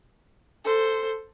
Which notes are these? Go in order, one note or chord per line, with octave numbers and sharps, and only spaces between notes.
A4 C5